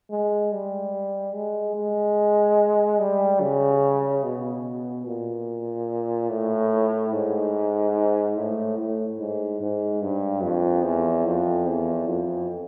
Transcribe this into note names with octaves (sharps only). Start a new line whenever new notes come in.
G#3
G3
G#3
G#3
G3
C#3
B2
A#2
A2
G#2
A2
A2
G#2
G#2
G2
F2
E2
F2
E2
F2